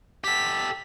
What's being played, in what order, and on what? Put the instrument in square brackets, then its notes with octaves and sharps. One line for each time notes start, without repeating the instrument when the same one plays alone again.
[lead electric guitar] G4 A4 [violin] B6